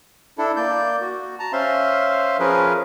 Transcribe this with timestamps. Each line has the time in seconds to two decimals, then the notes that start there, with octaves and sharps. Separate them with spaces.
0.38 D4 E4 A4
0.57 A#3 D5 G6
1.01 F#4
1.39 A5 A#5
1.53 C#4 C5 E5 F5 C6
2.40 F3 C#4 G#4 A#4 B4